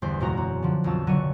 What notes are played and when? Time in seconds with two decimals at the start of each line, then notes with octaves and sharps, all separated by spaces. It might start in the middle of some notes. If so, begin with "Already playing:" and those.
0.02 G1 E2 C5 D5 B6
0.20 E1 C#2 F#2 G#3 F#4 A#5
0.33 C4 F#4
0.62 D3 F3 D4
0.84 B1 F2 F#3 A5 E6
1.07 F#1 D3 F#3 D4 C#6 D#7